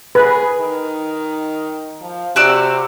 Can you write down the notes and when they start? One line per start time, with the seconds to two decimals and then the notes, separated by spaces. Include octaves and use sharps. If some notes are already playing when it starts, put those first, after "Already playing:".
0.15 G#4 B4
0.59 D#3
2.01 F3
2.36 C3 F#4 D5 E6